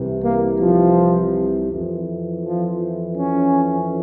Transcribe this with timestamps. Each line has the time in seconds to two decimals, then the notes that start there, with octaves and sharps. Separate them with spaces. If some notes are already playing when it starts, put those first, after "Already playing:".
Already playing: C2 C3 E3
0.24 A#3
0.60 F3
1.71 F2 E3
2.45 F3
3.17 C#4